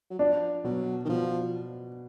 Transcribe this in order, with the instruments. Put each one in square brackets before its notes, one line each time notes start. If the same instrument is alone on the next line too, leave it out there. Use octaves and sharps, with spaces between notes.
[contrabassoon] F#3
[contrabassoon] F3 [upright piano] D4
[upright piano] B2 [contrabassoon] F#3
[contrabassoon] D#3
[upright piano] B2 [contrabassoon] F3